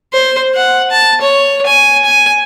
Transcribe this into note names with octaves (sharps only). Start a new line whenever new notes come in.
C5
F#5
A5
C#5
G#5
G#5